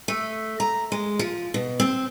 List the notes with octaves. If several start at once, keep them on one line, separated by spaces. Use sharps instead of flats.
A3
A#5
G#3
F3
B2
C4